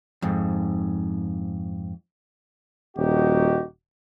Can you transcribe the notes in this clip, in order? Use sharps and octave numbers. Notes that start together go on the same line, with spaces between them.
F2 G#2
D#1 D#4 F#4 G4